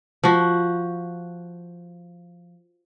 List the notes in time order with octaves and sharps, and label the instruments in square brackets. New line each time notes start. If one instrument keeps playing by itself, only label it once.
[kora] F3 F#4